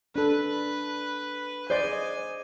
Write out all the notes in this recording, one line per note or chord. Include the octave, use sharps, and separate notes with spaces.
D4 A4 B4
G#4 C5 D5 D#5 G#5